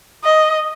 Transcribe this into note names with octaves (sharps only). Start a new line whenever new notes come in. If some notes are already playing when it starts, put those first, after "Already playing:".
D#5